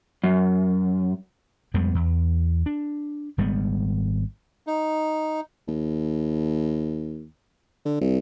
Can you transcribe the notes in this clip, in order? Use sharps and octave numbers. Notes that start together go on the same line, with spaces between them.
F#2
F2 G3 G#3 B3
E2
D4
G#1 G3 G#3 B3
D#4
D#2
D3
C2